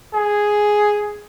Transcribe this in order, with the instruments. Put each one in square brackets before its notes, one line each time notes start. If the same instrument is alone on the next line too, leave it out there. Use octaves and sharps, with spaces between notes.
[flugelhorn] G#4